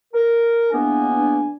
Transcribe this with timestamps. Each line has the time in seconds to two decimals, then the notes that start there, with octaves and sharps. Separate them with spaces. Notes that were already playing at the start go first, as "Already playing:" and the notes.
0.14 A#4
0.72 E2 A#3 B3 D4 G#5